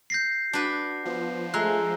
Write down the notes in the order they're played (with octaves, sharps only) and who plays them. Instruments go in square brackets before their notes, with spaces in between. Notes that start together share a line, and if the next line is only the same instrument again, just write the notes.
[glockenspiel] G6 A#6 C7
[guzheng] D4 B4 [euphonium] F#4
[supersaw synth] F3 [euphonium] B3
[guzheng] G#3 [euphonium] A3 [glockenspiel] A#5 E6 F#6